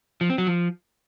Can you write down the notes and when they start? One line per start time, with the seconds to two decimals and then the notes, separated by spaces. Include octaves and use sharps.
0.21 F3
0.30 C4
0.38 F#3
0.47 F3